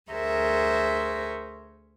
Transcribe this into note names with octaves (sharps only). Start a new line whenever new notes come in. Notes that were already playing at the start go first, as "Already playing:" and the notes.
D2 G#4 A#4 C5 E5 C#6